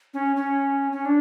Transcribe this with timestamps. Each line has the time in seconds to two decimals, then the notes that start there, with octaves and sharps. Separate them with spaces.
0.14 C#4
0.36 C#4
0.92 C#4
1.05 D4